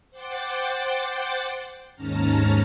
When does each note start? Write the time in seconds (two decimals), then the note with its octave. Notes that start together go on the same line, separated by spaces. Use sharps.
0.11 C5 F#5 G5 D6 A6
1.96 D#2 G#2 C#4 A5 A#5 F6